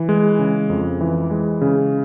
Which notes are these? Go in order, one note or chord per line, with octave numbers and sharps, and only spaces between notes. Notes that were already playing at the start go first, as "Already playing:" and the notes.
Already playing: E3
G#3
C#3
F2
E3
G#3
C#3